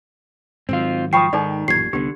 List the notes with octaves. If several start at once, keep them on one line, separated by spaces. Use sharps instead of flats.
G#2 D#3 F#3 C4 F4
F3 G5 B5 C#6 D#6 C7
G#2 D#3 D#4 A4 D5
A1 F#2 A#2 G4 G#6 C7
C2 D3 B3 G4